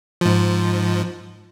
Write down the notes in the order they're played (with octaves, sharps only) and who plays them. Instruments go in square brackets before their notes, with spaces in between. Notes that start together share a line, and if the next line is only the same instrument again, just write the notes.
[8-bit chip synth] G#2 F3